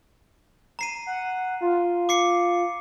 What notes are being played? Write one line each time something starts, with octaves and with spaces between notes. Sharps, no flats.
A#5 C7 D#7
F#5
F4
D6 C7 C#7